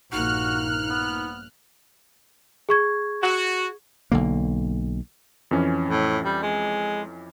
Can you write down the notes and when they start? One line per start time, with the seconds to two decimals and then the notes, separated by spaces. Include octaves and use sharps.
0.12 A#1 G2 A#3 D#4 F#4 F6 F#6
0.90 B3
2.69 G#4 C#6 G#6
3.22 F#4
4.12 B1 D3 A#3
5.51 F2 E3 C#4
5.90 A2
6.24 G3
6.42 G#3